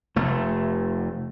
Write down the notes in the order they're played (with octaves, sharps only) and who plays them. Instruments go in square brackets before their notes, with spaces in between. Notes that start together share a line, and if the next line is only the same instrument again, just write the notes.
[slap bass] F1 A3